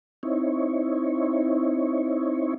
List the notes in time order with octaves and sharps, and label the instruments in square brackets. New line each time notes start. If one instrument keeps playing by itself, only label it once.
[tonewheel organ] C4 D#4 E4 C#5